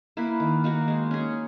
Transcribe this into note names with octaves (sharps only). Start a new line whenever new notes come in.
A#3 E4 B4
D#3
A#3 D#4 F#4
G#3
C#4 G#4